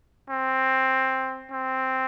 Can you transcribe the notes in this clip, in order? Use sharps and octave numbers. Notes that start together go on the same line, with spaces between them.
C4
C4